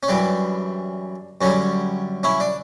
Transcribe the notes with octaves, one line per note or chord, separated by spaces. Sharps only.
C#4
F#2 E3 G3 D4
F#2 D3 G3 C#4
C#4 E4
D4